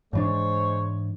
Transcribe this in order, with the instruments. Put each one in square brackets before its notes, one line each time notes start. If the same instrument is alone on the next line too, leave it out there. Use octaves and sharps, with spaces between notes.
[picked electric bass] G#2 E3 D4 [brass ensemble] G#3 C5 C#5